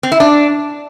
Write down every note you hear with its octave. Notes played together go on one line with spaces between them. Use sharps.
C4
E4
D4